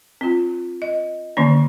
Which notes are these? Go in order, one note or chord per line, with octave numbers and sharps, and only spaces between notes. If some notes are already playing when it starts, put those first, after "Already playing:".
C4 F4
D#5
D3 D#3 A#3 C#4